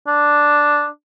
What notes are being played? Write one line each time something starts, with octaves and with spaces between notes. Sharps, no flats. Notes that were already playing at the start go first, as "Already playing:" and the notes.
D4